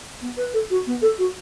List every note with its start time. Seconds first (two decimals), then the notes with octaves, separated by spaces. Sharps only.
0.22 B3
0.37 B4
0.54 A4
0.70 F#4
0.87 B3
1.02 A4
1.18 F#4